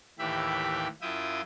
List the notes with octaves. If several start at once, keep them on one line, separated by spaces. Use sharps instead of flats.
D#2 A2 E3 G4 E5 B5
F#2 E4 F4 E5 G5 D#6